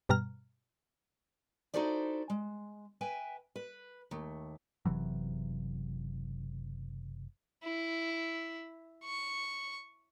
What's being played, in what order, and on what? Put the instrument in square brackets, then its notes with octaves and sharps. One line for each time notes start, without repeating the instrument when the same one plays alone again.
[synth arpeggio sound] G2 B2 G3 A#5 F6
[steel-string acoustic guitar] D#4 E4 F#4 A4 C5 D5
G#3
B4 E5 G5 G#5
B4
D#2 A3
[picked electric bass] F#1 C3 E3 F#3
[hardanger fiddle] E4
C#6